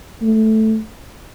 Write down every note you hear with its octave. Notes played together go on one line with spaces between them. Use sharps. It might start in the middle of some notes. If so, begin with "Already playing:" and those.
A3